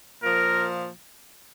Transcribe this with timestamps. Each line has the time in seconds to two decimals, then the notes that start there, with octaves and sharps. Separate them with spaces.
0.23 A#2 F3 A#4